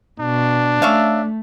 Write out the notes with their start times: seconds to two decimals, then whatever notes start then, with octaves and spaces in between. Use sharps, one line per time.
0.20 B2 D4
0.82 A3 C#4 E5 F5